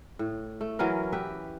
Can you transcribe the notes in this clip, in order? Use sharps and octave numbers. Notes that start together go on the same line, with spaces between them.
A2
A3
E3 F#3 C#4 A#4
G4 B4 E5